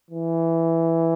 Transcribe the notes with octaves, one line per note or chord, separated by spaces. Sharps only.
E3